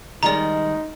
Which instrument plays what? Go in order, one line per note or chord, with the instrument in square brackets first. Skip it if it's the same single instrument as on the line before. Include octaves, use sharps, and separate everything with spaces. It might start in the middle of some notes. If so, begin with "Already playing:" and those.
[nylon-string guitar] D#3 G3 G#3 [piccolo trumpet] D#4 [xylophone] D5 A#5